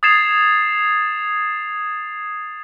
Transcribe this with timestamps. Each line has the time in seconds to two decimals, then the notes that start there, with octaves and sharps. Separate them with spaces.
0.03 D#6 G#6 A6 C7 E7 F7